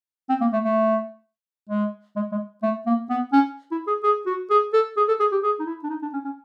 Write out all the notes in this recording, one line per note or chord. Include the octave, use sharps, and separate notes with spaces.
C4
A#3
A3
A3
G#3
G#3
G#3
A3
A#3
B3
C#4
E4
G#4
G#4
F#4
G#4
A4
G#4
A4
G#4
G4
G#4
D#4
E4
D4
D#4
D4
C#4
C#4